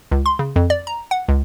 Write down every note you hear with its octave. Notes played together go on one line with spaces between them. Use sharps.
C#2
C6
C#3
F2
D5
A#5
F#5
C#2